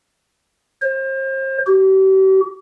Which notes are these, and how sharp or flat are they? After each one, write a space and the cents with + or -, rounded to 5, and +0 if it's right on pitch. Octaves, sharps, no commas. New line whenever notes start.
C5 +35
G4 -40